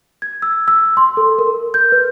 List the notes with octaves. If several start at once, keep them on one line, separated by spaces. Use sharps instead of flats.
G#6
E6
E6
C6
A4
A#4
G6
B4